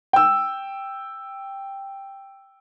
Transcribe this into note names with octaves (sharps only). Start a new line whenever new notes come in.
G5 E6